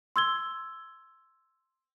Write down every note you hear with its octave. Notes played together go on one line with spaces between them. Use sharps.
C6 E6 G#6 G7